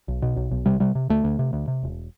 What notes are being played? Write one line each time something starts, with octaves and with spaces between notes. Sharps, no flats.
B1
B2
B1
B1
C3 G3
C3 G3
C3
D2 A3
D2
C3
D2
C3
E1